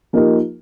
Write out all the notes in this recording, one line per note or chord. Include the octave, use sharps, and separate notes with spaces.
F3 A#3 D#4 G4 A#4